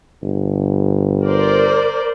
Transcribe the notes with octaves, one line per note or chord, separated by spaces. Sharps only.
G1
A#4 C5 D5